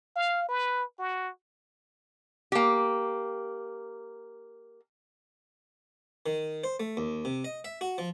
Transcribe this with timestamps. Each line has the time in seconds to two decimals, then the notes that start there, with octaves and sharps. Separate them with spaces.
0.16 F5
0.49 B4
0.99 F#4
2.52 A#3 G4
6.26 D#3
6.64 C5
6.80 A3
6.97 D#2
7.25 C3
7.44 D#5
7.64 E5
7.81 F#4
7.98 F3